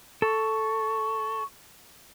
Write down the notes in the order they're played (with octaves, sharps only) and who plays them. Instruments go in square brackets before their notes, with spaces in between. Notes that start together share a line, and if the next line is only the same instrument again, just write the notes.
[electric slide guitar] A4 [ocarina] C#6